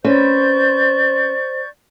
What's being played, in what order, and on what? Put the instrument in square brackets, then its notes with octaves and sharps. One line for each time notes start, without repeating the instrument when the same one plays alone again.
[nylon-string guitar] C4 C#4 B4 [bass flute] C5 [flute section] D5 C#6 G6